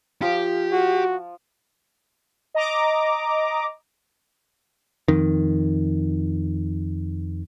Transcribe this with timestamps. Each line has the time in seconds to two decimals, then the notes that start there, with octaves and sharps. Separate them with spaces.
0.22 F3 G4 F5
0.73 F#4
2.55 D#5 A#5 D6
5.08 F2 D#3